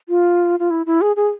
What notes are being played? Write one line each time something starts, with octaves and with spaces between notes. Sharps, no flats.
F4
F4
E4
E4
G#4
G#4